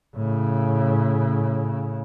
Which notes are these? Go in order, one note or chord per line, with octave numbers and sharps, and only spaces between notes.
A2 C#3